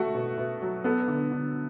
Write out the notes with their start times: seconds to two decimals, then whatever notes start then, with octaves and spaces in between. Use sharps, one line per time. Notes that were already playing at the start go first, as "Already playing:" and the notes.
Already playing: A3 F#4
0.15 B2
0.38 B2
0.62 F#3
0.84 B3 A4
1.08 D3
1.32 D3